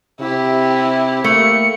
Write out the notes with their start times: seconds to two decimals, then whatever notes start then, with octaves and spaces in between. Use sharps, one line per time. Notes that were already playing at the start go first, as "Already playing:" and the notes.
0.21 C3 E4 G4
1.24 A3 A#3 C#7